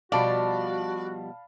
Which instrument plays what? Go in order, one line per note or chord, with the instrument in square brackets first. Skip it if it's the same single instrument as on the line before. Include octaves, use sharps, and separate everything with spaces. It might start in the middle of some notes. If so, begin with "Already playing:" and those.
[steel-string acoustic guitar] B2 F3 G3 [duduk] F#4 [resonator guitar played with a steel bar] D5 [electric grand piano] F5 A5 B5